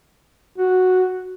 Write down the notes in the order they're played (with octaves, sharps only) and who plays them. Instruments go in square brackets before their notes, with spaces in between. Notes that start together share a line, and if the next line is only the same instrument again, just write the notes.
[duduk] F#4